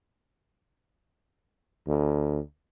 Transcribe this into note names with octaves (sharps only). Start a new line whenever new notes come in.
D2